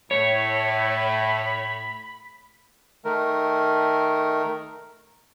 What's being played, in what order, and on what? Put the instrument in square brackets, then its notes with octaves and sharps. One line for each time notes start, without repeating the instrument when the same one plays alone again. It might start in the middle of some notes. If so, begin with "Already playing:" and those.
[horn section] A2 [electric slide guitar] C#5 [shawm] B5
[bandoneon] D#3 A3 A#4